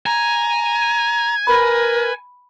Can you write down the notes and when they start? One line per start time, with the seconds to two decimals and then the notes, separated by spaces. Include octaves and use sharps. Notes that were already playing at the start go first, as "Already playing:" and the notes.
0.06 G#5 A#5
1.47 A#4 B4 B5